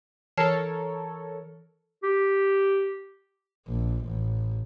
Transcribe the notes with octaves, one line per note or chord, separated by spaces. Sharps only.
E3 A4 A#4 C#5 A5 F6 C7
G4
A#1
A1